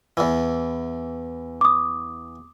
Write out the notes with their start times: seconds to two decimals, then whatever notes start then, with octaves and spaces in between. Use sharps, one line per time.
0.17 E2 E3
1.61 D6 D#6